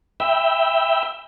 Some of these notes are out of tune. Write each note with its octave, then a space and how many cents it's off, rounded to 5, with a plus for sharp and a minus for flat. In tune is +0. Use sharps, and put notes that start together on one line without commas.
E5 +0 G5 +15 B5 +0